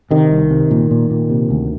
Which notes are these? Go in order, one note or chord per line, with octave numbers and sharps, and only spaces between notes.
C3 D#3
C2
C3
A#2
A#2
A#2
C3
D2